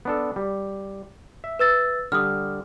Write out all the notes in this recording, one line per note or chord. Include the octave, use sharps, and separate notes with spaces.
B3 D4 A4
G3
E5
B4 E6 A6
D3 G3 D#6 F6